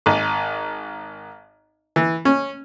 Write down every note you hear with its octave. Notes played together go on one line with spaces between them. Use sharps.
G#1
E3
C#4